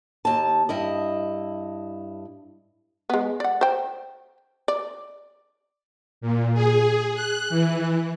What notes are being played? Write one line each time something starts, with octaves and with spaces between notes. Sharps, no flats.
D#2 A5
G2 E4 D#5
G#3 B3
D5 F#5
C5 G5
D5
A#2
G#4
F#6
E3